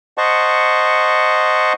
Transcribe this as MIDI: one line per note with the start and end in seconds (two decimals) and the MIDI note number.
0.18 1.73 72
0.18 1.73 75
0.18 1.73 78
0.18 1.73 81
0.18 1.73 85